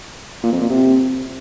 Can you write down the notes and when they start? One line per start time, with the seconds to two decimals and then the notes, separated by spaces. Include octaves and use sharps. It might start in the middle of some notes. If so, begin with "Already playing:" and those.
0.43 A#2
0.52 F2
0.61 A#2
0.69 C3